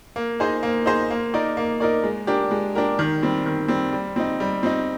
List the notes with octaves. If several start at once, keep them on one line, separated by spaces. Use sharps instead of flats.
A#3
D#4 G#4 C5 D#5
A#3
D#4 G#4 C5 D#5
A#3
D#4 A#4 D5
A#3
D#4 A#4 D5
G#3
D4 G4 A#4
G#3
D4 G4 A#4
D#3
G3 C4
D#3
G3 C4
G3
C4 D#4
G3
C4 D#4